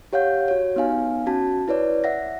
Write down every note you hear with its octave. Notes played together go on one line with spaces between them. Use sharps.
G4 C#5 F5 F#5 G6
F#4 C#5
B3 D#4 F5 G#5
C#4 F#4 A5
E4 B4 C#5 D5
E5 F#5 A#6